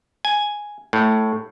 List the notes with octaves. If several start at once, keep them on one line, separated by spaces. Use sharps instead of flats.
G#5
A2